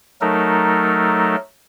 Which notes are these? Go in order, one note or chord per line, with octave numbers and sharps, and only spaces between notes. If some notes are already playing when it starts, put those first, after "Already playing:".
F#3 A3 D#4 A4 A#4